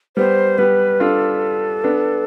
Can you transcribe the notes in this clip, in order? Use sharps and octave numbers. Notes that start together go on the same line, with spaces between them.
G3 B3 C5
G3 B3 B4
D4 F4 A4
B3 D4